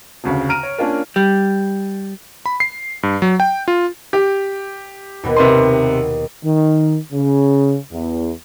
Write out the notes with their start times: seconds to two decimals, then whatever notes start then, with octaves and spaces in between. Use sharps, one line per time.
0.24 F1 D2 C#3
0.49 A#5 F6 D7 D#7
0.63 C#5
0.78 A#3 C#4 D4 F4 A#4
1.16 G3
2.46 B5
2.60 C7
3.03 G2
3.22 F#3
3.40 G5
3.68 F4
4.13 G4
5.23 D#2 B2 B3
5.37 C3 B4 C6
6.43 D#3
7.13 C#3
7.90 E2